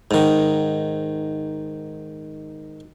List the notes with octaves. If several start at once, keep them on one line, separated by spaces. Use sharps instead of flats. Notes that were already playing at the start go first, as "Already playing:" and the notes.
G#2 D#3